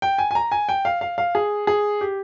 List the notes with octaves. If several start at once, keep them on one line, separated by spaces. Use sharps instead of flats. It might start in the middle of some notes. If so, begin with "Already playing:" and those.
G5
G#5
G#5
A#5
G#5
G5
F5
F5
F5
G#4
G#4
G4